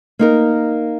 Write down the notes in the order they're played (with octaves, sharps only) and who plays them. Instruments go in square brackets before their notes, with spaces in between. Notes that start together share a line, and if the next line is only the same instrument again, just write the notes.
[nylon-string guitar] A#3 D#4 A#4